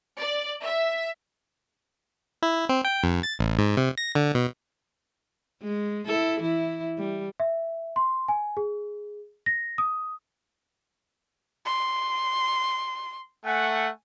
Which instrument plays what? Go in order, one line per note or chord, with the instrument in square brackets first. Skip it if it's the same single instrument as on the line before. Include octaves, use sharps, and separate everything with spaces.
[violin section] D5
E5
[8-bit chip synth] E4
C4
G5
F2
A6
A1
G#2
C3
A#6
D3
B2
[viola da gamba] G#3
E4 A4
E3 E4
G3
[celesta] E5
C6
G#5
G#4
A#6
D#6
[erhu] C6
[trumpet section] A3 F#5 [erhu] G#5